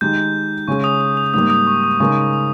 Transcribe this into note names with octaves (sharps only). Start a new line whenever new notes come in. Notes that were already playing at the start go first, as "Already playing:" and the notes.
D#3 G#3 D#4 G4 G6
C#3 G#3 C#4 G#4 C#6
D#6
D#6
D#6
G#2 G3 A#3 D#6
D#6
C#6
D#6
C#3 G#3 D#4 A#4 C#6
D#6